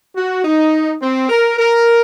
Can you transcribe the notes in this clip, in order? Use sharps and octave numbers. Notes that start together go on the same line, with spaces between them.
F#4
D#4
C4
A#4
A#4